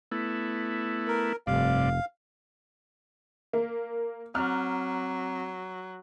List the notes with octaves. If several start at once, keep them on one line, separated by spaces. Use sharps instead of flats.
A3 B3 E4
A#4
F1 G2 C3 D5 F5
A#3 A#4
F#3 C4 A#5 D6 F6